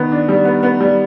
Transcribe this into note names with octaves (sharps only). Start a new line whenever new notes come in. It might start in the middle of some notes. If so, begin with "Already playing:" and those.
Already playing: D#3 B3
D4
G3
B3
B3
G3